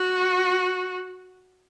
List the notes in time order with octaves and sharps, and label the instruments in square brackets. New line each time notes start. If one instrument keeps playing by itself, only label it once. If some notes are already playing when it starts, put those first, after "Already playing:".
Already playing: [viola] F#4